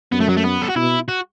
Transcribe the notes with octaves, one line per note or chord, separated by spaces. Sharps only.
F#2 B3
A3
F#3
A3
B3
A4
F#4
B2 E4
F#4